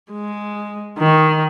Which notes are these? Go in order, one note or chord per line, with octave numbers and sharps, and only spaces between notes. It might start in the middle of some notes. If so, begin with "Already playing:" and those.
G#3
D#3